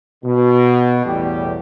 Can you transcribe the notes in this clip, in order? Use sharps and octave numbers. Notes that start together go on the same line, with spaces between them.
B2
A1 E2 G3 G4